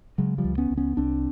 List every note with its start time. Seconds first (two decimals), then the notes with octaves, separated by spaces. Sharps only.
0.18 C#3 F#3 G#3
0.38 F3 G3
0.44 C#2
0.58 B3 C#4
0.71 C#2
0.77 B3 C#4
0.97 C2 C4 D4